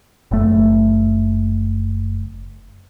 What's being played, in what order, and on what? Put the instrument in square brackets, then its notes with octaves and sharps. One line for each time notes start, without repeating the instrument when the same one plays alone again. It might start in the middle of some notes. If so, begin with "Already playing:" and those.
[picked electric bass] F#1 A3